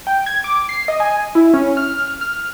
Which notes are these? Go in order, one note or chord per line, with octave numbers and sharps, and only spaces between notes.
G5
G#6
D6
C7
D#5
G#5
E4
C#4
F6
F6